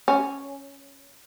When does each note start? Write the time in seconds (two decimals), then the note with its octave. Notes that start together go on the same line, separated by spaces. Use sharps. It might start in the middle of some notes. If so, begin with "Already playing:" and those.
0.08 C#4